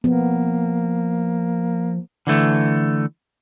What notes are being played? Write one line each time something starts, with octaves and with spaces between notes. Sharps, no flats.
F3 A#3 B3
D3 E3 A3